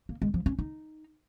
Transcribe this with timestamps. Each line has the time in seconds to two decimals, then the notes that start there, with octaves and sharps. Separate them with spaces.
0.09 A#3
0.22 G#3
0.34 F3
0.46 C#4
0.59 D#4